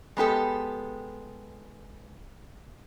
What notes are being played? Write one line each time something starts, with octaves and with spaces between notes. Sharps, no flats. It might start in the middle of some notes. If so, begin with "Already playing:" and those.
G#3 B3 G4 A4